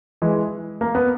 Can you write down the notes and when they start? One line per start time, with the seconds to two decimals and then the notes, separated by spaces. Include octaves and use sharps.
0.22 E3 G#3
0.81 A#3
0.95 B3